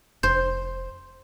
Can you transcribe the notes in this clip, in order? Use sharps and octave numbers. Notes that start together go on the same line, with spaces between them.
F1 C5